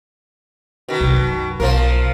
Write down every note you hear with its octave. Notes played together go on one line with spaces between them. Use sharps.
B2 D#3
C2 F3
F#2
B1 F3 A#3 A#4